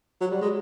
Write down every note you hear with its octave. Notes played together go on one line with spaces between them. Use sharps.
F#3
G3
G#3